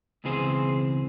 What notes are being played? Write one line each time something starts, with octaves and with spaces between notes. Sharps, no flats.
C#2 B2 E3 C4 G#4 C5